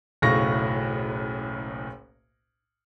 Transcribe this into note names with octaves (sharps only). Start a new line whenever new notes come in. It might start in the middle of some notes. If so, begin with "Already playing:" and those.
F#1 B1 A2 F5 C#6 A#6